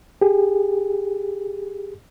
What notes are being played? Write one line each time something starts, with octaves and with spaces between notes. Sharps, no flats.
G4 G#4